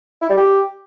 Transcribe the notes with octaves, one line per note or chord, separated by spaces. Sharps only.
E4
G3
G4